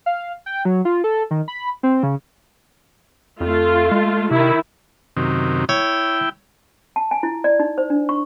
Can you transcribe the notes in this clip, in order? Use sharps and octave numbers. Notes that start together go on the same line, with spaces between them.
F5
G5
F#3
F4
A4
D#3
B5
C4
C#3
F2 A3 F4
G#3
C3 D#3 E4
F#2 C3 D#3
E4 C#5 G5
A5
G#5
E4
D5
D#4
C5
D4
C#6